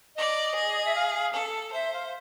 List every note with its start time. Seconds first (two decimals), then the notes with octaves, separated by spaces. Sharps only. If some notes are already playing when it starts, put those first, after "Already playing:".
0.16 D5 D#5
0.56 G#4
0.85 E5
0.95 F5
1.34 A4
1.73 C5 E5
1.93 F5